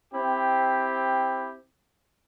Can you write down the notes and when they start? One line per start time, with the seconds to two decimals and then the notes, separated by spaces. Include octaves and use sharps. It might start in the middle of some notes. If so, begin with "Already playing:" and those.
0.13 C4 E4 G4